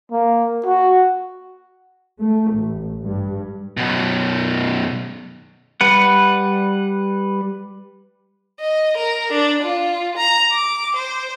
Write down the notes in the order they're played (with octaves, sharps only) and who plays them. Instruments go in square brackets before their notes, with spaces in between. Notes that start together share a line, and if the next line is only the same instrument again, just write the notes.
[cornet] A#3
F#4
[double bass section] A3
A1
G2
[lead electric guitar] F#2 B2
[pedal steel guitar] G3 B4 F#5
[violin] D#5
A#4
D4
F4
A#5
D6
C5